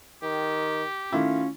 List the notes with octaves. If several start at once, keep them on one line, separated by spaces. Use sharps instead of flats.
D#3 G4
D#3 A3 C#4 E4 F4